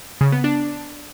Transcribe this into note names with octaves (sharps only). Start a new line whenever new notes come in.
C#3
B3
D4